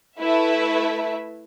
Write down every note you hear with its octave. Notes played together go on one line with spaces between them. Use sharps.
A3 E4 B4 E5